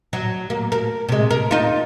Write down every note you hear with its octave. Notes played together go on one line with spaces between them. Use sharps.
F#3
A#3
A#4
C3 G#3
A#4
D#4 F4